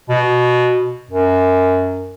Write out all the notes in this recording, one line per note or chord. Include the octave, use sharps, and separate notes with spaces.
B2
F#2